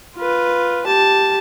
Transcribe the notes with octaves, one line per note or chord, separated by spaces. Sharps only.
F4 B4
G4 A5